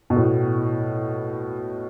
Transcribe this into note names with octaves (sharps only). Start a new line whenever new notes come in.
B2
A2